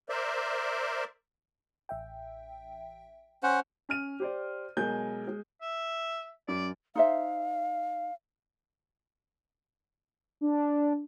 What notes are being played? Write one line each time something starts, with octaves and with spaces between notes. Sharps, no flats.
A#4 C5 D5 E5
A1 E5 G5
C#4 C5 F#5
C#4 F6 D#7
G4 C5 D5
B1 G#3 A#4 G#5 G6
G#3
E5
F#2 D5
D#4 C5 E5 F5
D4